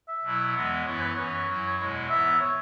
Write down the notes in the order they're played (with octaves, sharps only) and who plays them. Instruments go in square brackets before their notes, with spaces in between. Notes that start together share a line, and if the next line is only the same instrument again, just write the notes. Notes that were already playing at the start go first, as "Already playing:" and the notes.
[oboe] E5
[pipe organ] B2 F#3 E4
E2 E3 G#3 B3
[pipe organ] F#2 E3 B3 E4 [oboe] C#5
[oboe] B4
[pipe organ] F#2 E3 C#4 [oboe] C#5
[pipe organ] F#2 F#3 E4
E2 B2 G#3 E4
[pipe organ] G#2 E3 B3 E4 [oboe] E5
[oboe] C#5